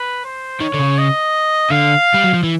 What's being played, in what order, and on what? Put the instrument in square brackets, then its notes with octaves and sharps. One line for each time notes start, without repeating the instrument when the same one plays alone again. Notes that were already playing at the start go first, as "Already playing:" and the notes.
Already playing: [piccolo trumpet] B4
C5
[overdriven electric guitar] D#3 [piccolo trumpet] C#5
[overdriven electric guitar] D3
C#3
[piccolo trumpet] D#5
[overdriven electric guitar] D3 [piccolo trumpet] F5
[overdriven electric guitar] G3
F#3
F3
E3